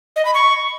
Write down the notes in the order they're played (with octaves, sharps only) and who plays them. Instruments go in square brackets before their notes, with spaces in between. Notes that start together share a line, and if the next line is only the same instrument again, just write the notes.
[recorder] D#5
B5
C#6